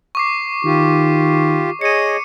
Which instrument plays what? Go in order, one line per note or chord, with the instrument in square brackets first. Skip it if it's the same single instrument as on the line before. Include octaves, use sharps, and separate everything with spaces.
[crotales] C#6 D6 C7
[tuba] D#3 [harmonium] F4 G4
[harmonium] G#4 C#5 D#5 [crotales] C#7 D#7